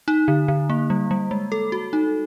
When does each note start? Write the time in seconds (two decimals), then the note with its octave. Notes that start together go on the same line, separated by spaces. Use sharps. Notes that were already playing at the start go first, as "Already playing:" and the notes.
0.08 D#4
0.28 D3
0.48 D3
0.70 A#3
0.90 G3
1.11 G3
1.31 G#3
1.52 A4
1.72 F#4
1.93 D#4